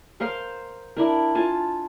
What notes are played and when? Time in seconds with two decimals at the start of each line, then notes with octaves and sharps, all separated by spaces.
0.20 A#4 C5 F5 C6
0.97 D4 E4 A#4
1.35 F4 G#5 A5